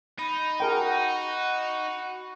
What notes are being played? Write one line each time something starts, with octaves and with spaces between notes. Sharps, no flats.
D#4 B5
F#4 G#4 A#4 G5